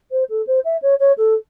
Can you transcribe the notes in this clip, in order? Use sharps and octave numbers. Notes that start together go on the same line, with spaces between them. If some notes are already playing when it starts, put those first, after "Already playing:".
C5
A4
C5
E5
C#5
C#5
A4